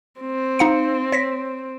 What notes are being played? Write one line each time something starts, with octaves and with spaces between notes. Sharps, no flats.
C4
D#4 F5 C#7
C#5 A#6 B6